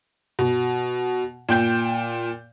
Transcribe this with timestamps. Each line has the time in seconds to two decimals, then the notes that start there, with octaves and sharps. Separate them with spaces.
0.39 B2
1.49 A#2 G5 G6